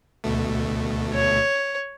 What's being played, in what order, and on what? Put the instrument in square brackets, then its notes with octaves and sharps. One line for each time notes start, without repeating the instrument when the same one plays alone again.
[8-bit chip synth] D2 B2 A3
[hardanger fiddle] C#5